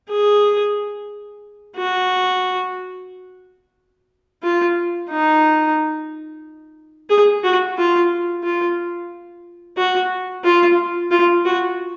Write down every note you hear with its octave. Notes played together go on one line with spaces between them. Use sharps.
G#4
F#4
F4
D#4
G#4
F#4
F4
F4
F#4
F4
F4
F#4